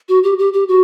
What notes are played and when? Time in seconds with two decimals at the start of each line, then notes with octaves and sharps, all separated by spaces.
0.09 F#4
0.23 G4
0.39 G4
0.53 G4
0.68 F#4